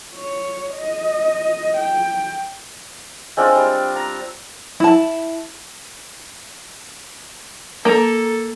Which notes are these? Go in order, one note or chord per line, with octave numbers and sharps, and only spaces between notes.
C#5
D#5
G5
G#3 C4 D4 F4
G3
A#5
E4 A5
A#3 A4 A#5